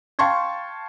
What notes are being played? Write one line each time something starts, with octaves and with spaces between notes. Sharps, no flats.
F5 G5 A5 C6 C#6 G#6